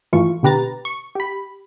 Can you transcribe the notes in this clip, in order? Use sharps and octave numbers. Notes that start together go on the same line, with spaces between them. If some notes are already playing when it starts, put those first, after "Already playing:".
G2 E3 A3 F4 C#6
B2 D3 G4 B4 A#5 A6
C#6
G4 B5